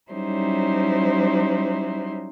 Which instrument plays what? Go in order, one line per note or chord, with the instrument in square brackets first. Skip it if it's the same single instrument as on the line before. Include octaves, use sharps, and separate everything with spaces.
[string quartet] F#3 G3 C#4 D#4 E4 C5